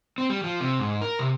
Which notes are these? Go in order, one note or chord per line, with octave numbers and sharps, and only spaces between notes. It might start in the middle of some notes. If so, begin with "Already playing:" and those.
C4
G3
F3
C3
G#2
A#4
C3